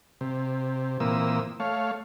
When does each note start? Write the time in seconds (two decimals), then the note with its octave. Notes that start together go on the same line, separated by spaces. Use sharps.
0.21 C3
1.00 A#2 E3 A#3 C4 D#6 E6
1.60 A3 C#5 F5